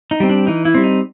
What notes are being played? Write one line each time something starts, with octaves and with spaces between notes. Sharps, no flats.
D#4
G3 C4
D4
E3 D#4
E4
G3 C4
D#4